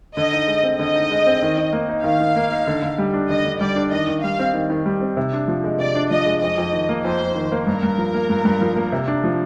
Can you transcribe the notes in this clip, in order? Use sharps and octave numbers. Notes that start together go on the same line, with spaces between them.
D3 D#5
D#4
G#3
C4
D3 D#5
D#4
G#3
C4
D#3
D#3
A#3
D#4
D#3 F5
D#3
A#3
D#4
D3
D3
G3
D4
D3 D#5
D3
G3 D5
D4
D#3 D#5
D#3
G3 F5
C4
D#3
D#3
G3
C4
C3
D4
F3
G#3
C3 D5
D4
F3 D#5
G#3
F2 D#5
F2
D#3
A#3
F2 C5
F2
D#3
A#3
G2 A#4
G2
F3
A#3
G2
G2
F3
A#3
C3
D4
F3